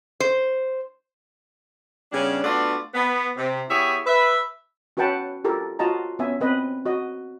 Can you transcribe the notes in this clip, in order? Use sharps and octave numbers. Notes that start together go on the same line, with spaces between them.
C5
C#3 G3 B3 C#4 D4
A3 B3 D4 F4 F#4 D5
B3
C3
B3 E4 G4 G#4 C#5 E5
B4 E5
C#4 F#4 B4 F#5 G5 A5
F4 G4 A4 A#4
F4 F#4 D#5 A5 A#5
B3 C#4 E5 G#5
C4 B4 D#5
F#4 D#5